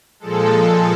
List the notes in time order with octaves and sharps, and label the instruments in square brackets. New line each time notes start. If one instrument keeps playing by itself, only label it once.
[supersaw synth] A#2 F3 G#3 A4